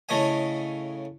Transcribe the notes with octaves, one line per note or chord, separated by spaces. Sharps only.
A2 C#3 A3 D#5 G#5